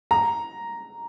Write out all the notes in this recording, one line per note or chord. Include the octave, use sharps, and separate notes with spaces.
A#5